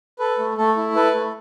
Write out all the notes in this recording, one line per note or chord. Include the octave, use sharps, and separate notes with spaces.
A4 B4
A3
A3 A4
E4
A4 B4
A3